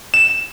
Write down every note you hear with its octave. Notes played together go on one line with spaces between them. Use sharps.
E7